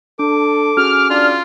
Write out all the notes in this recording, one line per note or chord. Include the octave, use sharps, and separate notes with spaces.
D4 A4 D6
C#4 F#4 G#4 F6
D4 F4